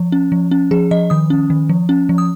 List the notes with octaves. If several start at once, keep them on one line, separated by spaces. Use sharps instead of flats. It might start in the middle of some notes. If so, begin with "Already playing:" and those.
Already playing: F3
C#4
F3
C#4
F3 G#4
F3 D#5
D#3 D#6
C#4
D#3
F3
C#4
F3
D#6